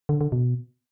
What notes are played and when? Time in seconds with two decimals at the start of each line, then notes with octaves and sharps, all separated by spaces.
0.09 D3
0.21 D3
0.32 B2